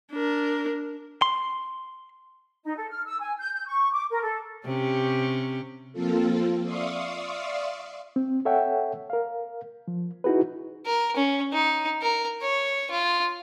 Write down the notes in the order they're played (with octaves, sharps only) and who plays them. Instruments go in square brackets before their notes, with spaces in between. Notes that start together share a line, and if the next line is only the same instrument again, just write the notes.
[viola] D4 A#4
[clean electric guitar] C6
[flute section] D#4
A4
F6
E6
G#5
G6
G6
C#6
D6
A#4
A4
[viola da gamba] C3 C#4 G4
[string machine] F3 A#3 C4 F4 A4
D5 E5 F5 C6 C#6 D#6
[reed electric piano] C4
A4 C#5 E5 F#5 G5
A#4 F5
F3
D#4 E4 F#4 G#4 B4
[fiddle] A#4
C#4
D#4
A#4
C#5
F4